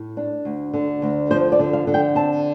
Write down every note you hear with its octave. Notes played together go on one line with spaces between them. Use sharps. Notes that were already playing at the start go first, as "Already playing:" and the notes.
Already playing: A2
D4
D2
D3
D2
F3 C5
D5
D3
F5
D3
G5
C4 A5